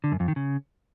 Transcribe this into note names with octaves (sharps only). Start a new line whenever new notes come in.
D3
F#2
F2
D#3
C#3